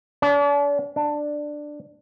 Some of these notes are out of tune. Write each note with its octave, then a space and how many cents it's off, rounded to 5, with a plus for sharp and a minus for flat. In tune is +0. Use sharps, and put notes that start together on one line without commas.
D4 -40
D4 +10